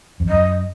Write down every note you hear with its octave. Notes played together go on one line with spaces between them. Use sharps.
F2
F#2 D#5